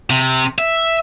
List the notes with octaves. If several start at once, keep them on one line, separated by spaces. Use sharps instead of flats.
C3
E5